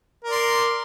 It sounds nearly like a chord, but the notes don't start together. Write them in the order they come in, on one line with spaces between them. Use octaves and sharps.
A#4 D5 C6